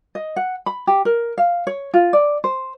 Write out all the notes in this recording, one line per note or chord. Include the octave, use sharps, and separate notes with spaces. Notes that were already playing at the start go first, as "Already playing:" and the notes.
D#5
F#5
B5
G4
A#4
F5
C#5
F4
D5
C5